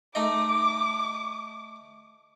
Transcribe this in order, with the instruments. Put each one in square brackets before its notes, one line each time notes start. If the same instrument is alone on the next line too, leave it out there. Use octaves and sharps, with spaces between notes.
[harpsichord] A3 D#4 D#5 [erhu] D6